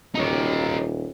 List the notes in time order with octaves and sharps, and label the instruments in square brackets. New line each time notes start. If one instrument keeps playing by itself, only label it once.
[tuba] D#1 [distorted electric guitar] D#4 C#5